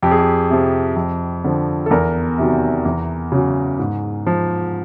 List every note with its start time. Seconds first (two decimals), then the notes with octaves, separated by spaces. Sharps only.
0.02 F2 G4
0.11 G#4
0.19 G4
0.50 C3 F3
0.96 F2
1.44 D3 F3
1.86 A4
1.91 E2 A#4
2.38 C3 D#3 F#3
2.85 E2
3.32 C#3 F#3
3.79 G#2
4.26 F3